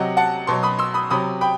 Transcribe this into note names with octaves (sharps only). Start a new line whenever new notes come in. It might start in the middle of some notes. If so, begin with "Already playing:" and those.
Already playing: C3 F#3 D#5 F#5
F#5 A5
B2 F#3 A5 C6
B5 D#6
C6 E6
B5 D#6
C3 F#3 B5 D#6
G5 B5